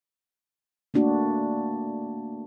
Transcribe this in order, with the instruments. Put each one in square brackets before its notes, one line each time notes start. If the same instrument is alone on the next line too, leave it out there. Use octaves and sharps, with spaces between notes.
[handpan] A3 A#3 D4 F#4